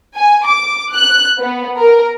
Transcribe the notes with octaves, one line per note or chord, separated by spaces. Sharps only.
G#5
D6
F#6
B3
A#4